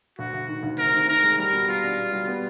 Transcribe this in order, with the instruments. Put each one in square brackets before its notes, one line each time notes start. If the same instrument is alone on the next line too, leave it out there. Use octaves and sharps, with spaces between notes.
[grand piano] D2 [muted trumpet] F#4
[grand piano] D2
D#3
D2
[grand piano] C3 [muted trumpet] A#4
[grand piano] D#3
[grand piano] D#3 [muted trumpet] A#4
[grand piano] G#3
[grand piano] G3 [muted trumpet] A#4
[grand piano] B2
[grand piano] B2 [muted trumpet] F4
[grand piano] D4
B2
G3
B3